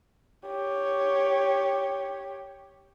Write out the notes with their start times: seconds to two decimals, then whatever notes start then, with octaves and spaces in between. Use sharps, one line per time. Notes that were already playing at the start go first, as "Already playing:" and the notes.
0.47 G4 C#5